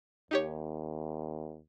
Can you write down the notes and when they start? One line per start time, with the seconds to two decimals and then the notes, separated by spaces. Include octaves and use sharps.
0.31 D#2 D#4 G4 C#5